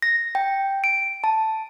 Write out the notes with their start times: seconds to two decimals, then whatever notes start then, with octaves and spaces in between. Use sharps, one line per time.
0.02 A#6
0.35 G5
0.84 D7
1.24 A5